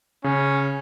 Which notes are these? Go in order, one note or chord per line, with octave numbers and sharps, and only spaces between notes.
C#3 C#4